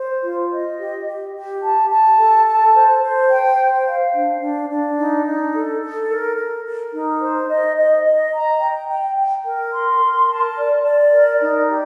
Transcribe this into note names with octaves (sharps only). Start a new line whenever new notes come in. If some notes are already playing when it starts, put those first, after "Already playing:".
Already playing: C5
F4
D#5
G4
G4
G4
A5
A5
A4
A5
C5
C5
G5
C5
F5
D4
D4
D4
D#4
D#4
A4
A4
A#4
A#4
A#4
D#4
C5
D#5
D#5
D#5
A#5
G5
G5
G5
A#4
C6
A#4
A5
D5
D5
A#4
D#4
G4